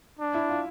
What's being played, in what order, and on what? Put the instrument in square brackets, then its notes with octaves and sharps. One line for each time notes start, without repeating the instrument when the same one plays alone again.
[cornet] D4
[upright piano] E4
F4